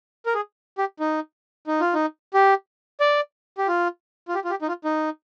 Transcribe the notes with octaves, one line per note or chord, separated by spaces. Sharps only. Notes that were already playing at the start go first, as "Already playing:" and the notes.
A#4
G#4
G4
D#4
D#4
F4
D#4
G4
D5
G4
F4
F4
G4
F4
G4
D#4
F4
D#4